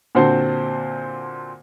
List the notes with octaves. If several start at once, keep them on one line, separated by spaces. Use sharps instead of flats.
A#2 D3 C4 F#4 C5 A5